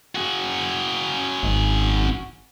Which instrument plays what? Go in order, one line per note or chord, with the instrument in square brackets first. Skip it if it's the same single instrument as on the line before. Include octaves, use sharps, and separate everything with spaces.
[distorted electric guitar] F#4 G#4
[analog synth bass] G#1